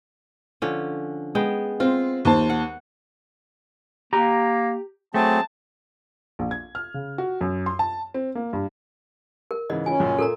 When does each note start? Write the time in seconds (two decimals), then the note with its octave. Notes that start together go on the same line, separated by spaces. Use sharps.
0.62 D3 F3 C#4
1.35 G#3 B3 G5
1.80 C4 F4
2.25 D#2 C5 A5
2.50 F#5
4.13 A#3 G4 A#5
5.14 F#3 A3 C4 G#4 A5
6.39 A#1
6.51 G#6
6.75 F6
6.94 C#3
7.18 F#4
7.41 F#2
7.66 C6
7.79 A5
8.14 C4
8.35 A#3
8.53 G2
9.51 A#4
9.70 G#2 C#3 E3 D#5
9.86 C#4 F4 G#5
10.00 C#2 F#2 A#2
10.18 A#2 A4 A#4 A#5